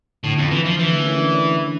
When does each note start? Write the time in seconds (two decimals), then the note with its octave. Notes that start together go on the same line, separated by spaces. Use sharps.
0.24 A2 D3
0.38 F2
0.51 E3
0.65 F3
0.79 D3 E3
0.92 A3
1.00 A#3
1.06 C#4
1.20 D4
1.33 C#4